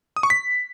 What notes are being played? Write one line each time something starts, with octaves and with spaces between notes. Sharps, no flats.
D#6
C#6
B6